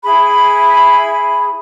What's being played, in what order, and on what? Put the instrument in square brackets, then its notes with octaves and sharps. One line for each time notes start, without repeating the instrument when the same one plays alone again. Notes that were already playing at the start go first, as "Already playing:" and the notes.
[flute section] E4 G#4 B5